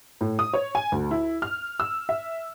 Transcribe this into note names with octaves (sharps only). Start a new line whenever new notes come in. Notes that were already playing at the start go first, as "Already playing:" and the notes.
A2
D#6
C#5
G#5
D2
E4
F6
E6
E5